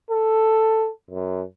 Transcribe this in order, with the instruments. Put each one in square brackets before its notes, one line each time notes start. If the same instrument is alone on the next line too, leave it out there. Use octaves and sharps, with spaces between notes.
[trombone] A4
F#2